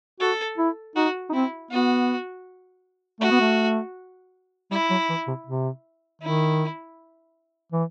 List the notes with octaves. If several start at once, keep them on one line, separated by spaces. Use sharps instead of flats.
F#4 A4
E4
D#4 F#4
D#4
C4 E4
B3 F#4
A3 F#4
B3
A3
G3 E4
F#3
E3
C3
C3
D#3 E4
E3